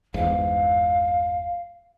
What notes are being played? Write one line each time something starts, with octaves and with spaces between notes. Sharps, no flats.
G1 E2 G#2 F5